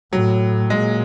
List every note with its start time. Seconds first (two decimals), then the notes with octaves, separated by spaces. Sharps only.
0.13 A2 F#3
0.69 A#2 G#3